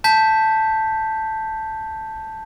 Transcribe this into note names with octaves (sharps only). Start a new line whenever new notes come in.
A5 G6 B6